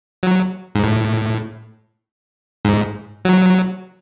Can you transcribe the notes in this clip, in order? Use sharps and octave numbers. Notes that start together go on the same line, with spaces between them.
F#3
G#2
A2
G#2
F#3